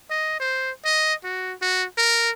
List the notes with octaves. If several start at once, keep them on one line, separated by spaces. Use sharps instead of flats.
D#5
C5
D#5
F#4
F#4
A#4